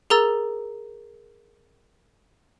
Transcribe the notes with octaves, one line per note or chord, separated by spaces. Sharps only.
G#4 A#4 A#5 E6 A6